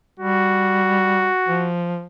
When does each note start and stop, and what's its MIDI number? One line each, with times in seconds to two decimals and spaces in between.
0.20 1.29 55
0.20 1.70 66
1.48 2.06 53